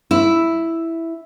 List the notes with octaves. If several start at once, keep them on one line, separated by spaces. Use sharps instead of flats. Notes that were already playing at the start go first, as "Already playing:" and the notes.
E4